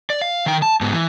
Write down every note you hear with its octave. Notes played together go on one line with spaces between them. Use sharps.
D5
F5
D#3 G5
A5
G#2 B3
E3